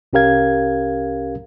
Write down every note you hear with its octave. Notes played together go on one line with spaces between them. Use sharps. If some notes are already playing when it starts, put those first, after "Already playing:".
C2 C#4 G4 A#4 F5 G#6